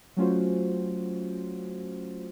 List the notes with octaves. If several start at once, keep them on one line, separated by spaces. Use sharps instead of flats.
F#3 A3 C#4 F4 F#4 C5